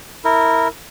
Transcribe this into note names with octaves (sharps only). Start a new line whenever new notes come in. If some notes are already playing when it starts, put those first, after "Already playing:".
E4 A#4